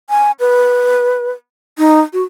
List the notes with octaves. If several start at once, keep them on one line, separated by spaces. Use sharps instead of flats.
G#5
B4
D#4
F#4